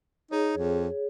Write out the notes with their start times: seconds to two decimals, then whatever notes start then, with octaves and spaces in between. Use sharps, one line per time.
0.31 D#4 G#4 C#5
0.57 F2